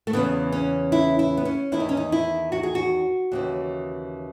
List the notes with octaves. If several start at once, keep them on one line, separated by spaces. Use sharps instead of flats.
A3
E2 C#3 E3 B3
C#4
E4
E4
B3
C#4
E2 D#3 E4
D#4
C#4
D#4
E4
F#4
G#4
F#4
D#2 C#3 E3